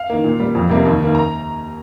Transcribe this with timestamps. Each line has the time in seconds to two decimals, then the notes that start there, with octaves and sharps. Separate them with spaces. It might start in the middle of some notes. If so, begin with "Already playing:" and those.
Already playing: F5
0.10 D#3 A#3
0.24 A#2
0.39 G3 A#3
0.55 F2
0.69 C3 G3 A#3
0.85 D#2
1.00 D#3 A#3
1.15 A#5